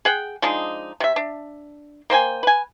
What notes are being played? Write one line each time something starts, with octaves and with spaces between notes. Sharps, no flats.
G#4 F#5 G5
F3 G#3 D4 D#4
C3 E5
D4
A#3 C5 G5 G#5
B4 G#5